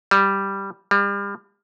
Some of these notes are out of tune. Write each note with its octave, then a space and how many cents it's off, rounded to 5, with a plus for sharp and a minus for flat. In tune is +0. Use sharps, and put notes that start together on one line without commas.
G3 +0
G3 +35